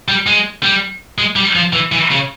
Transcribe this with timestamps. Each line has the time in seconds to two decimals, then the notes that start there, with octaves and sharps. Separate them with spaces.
0.08 G3
0.26 G#3
0.63 G3
1.18 G#3
1.36 G3
1.56 F3
1.73 E3
1.92 E3
2.11 C#3